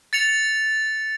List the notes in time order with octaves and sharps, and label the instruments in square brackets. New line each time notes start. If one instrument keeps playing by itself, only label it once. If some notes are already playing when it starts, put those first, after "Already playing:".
[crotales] A6 C#7 F7